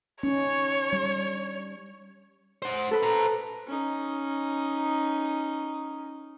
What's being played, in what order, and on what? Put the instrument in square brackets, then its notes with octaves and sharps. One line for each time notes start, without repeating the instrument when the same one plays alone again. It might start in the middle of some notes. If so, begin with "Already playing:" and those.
[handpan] C#4 D#4 [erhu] C#5
[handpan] G3
[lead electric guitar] C5 F#5
[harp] A4 B4 B5
[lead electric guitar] C5 A#5
[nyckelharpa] C#4 D#4